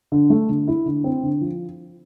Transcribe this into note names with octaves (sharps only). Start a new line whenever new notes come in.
D3
A3
D3
E4
D3
C4
D3
F3